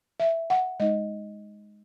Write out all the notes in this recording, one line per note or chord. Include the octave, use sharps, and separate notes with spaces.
E5
F#5
G#3 D#4 D#5